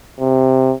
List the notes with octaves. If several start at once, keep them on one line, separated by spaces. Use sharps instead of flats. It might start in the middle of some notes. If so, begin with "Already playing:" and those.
C3